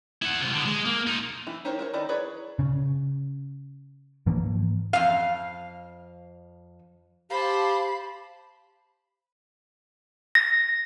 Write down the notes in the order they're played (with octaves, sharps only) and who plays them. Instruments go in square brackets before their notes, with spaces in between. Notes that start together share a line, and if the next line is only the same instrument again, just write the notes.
[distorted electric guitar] E4 F#5
C3 G#3
D3 B3
G#3
A#3
D#4 F4
[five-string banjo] E3 E4
D#4 G4 A#4 C5 C#5
A#4 C5 C#5
D#3 D#4 E4 D5 A#5
E4 G#4 B4 C#5 D5
[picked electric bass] C#3
G#2 E3 F3 A#3
[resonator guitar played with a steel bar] F2 F5
[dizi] G4 [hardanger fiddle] C5 A5 [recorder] F5 [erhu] B5
[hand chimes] A#6